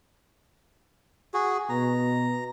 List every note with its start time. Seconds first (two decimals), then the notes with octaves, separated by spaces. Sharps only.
1.34 F#4 G#4
1.69 B2 A#5